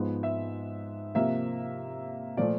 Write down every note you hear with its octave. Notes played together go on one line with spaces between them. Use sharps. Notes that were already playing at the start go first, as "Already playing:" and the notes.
Already playing: G#2 F3 G#3 B3
E5
C3 F3 A#3 E5
A#2 F3 A3 D5